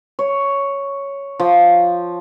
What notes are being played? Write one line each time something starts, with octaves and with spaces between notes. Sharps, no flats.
C#5
F3